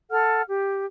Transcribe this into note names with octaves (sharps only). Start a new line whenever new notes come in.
A4 F#5 F6
G4